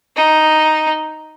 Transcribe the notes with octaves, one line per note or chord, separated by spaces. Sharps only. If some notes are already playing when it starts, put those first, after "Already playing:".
D#4